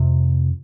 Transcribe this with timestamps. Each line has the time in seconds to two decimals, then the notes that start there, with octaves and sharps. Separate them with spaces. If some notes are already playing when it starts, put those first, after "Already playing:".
Already playing: F2 C3